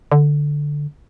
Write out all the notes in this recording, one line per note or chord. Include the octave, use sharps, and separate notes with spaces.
D3